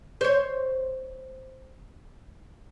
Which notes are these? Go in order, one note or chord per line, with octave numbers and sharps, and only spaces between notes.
C5 C#5